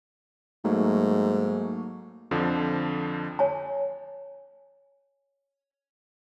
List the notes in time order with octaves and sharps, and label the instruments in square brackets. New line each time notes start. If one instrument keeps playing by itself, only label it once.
[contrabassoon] G#2 [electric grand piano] F#3 A3 A#3
[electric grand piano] F2 D3 F3
[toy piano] C#5 G#5 A5